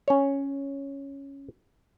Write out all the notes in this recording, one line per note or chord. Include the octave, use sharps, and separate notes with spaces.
C#4 C#5